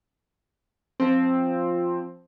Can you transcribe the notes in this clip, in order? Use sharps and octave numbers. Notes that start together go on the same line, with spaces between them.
F3 C4